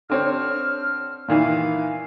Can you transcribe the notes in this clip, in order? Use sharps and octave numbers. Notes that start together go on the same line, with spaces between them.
D3 C4 C#5 F6
A#2 D#3 E3 F5